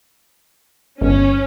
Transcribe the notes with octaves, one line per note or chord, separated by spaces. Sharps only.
G1 C#4